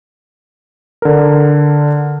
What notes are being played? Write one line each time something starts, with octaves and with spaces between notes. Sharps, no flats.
D3 A#4